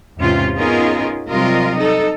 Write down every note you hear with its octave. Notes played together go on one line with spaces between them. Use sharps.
E2 G#2 C3 C#4 F4
B3 C#4 D#4 F4 G#4 A#4
C3 F#3 G3 F4 A#4 D#5
D#4 A4